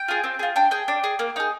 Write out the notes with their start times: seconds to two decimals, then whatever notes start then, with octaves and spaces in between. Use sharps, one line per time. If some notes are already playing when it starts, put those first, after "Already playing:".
Already playing: G5
0.08 F4 G#4
0.24 C4
0.39 F4 G#4
0.56 D4 G5
0.71 G#4 G5
0.88 D4
1.04 G#4
1.19 A#3
1.36 D#4 G#4